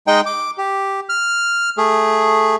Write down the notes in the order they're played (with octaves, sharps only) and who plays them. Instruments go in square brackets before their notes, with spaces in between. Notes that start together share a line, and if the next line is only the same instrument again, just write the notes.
[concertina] G#3 D#4 D#5 G5
D6
G4
F6
A3 G#4